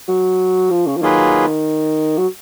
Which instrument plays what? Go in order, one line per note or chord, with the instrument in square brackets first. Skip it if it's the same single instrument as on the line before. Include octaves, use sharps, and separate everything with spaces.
[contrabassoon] F#3
F3
C#3
F3
[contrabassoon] D#3 [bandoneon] F#3 A#3 F4 G#4 B4
[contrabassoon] F#3